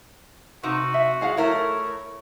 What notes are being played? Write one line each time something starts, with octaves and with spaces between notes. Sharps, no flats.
C3 D#4 F#4
E5
G#4 F5 F#5
A3 E4 A#4 C#5